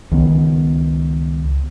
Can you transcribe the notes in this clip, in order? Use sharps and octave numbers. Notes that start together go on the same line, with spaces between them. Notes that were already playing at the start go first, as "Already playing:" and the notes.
C#2 D#3 B3